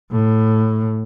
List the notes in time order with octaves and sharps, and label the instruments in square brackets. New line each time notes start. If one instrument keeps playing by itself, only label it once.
[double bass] A2